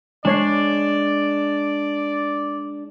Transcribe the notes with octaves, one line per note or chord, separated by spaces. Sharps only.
G#3 D4 C#5 D5 C7